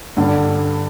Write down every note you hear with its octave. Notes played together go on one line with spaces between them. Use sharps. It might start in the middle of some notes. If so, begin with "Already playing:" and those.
G2 D3 G3 D4